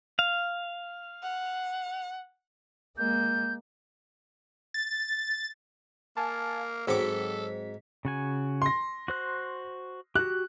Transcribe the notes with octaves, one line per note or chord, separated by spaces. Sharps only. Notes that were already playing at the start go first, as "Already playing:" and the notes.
F5
F#5
G#3 A#3 G6
A6
A#3 F5 G#5 A5
G#2 F#3 C4 A4 C#6 D6 B6
C#3 F#4 G#5
C6 A#6
F#4 C5 F#6
F#4 G4 F#6